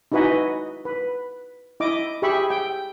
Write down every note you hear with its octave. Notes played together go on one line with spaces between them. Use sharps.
D#4 E4 F#4 B4 D#5 G#5
B4
E4 D#5 D6
G4 G#4 E5 B5 C#6
G5